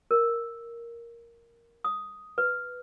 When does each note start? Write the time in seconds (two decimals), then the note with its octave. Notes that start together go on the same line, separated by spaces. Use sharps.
0.11 A#4
1.84 D#6
2.38 B4